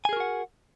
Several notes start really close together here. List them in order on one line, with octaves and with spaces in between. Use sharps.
G#5 G#4 A#4 F#4 F#5